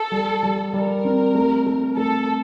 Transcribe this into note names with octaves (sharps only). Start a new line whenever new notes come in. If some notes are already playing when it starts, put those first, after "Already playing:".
Already playing: A4
G3
G3
G3 A#4
C4
A3
A3
A3 A4